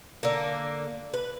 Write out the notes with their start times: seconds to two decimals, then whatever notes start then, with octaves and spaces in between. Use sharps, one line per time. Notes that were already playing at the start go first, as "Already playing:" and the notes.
0.23 D3 A#3
1.14 B4